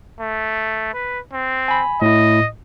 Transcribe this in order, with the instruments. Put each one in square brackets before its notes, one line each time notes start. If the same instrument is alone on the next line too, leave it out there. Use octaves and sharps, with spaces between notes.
[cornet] A3
B4
C4
[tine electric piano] G#5 B5
[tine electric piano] A2 E4 [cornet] D#5